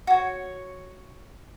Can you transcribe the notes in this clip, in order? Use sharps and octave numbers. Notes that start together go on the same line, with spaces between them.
F#4 C#5